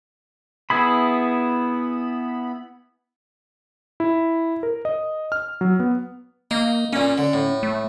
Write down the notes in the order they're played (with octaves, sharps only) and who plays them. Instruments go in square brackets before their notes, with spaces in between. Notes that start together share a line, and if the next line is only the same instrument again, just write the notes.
[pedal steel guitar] B3 E4 G#4 B5
[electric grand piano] E4
A#4
D#5
F6
F#3
B3
[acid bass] A#3 [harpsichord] D#4
[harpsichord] A#2 A#3 [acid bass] C#4
[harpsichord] D3
A2
[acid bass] A3